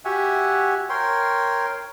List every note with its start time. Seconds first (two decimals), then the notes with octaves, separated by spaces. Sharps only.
0.05 F#4 G4 E5 F#5 G#5
0.90 A#4 C#5 G5 C6